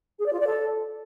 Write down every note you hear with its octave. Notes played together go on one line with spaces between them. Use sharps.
G#4
D5
F4
D5
A4